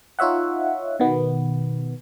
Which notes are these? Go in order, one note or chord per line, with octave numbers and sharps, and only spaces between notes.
D#4 F4 C#5 E5 F#5
B2 D#3 B3